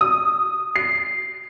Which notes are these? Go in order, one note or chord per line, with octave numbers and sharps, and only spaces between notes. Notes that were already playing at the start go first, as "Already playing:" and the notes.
D#6
C7